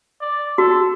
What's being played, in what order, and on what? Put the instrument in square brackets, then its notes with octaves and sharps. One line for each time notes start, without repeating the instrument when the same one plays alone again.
[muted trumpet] D5
[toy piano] F#4 [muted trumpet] A4